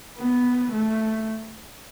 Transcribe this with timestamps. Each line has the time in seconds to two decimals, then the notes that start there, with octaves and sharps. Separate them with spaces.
0.17 B3
0.73 A3